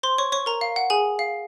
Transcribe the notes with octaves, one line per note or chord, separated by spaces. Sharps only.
C5 C6
C#5 C#6
C#5 C#6
A#4 A#5
F5
F#5
G#4 G#5
F5